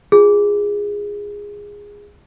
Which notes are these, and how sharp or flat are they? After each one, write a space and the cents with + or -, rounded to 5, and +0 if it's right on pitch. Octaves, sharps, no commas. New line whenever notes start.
F4 +0 G#4 -15